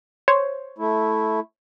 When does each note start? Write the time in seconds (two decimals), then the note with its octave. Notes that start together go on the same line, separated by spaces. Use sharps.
0.28 C5 C#5
0.78 A3 E4